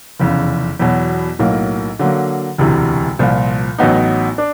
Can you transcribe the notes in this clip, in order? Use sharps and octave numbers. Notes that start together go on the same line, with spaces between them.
F1 E2 C#3
E2 B2 F#3
B1 A2 F#3 A#3
D3 F#3 A#3
E1 D2 C3 E3
C2 A#2 F3
A1 A2 F#3 B3 D#4
D4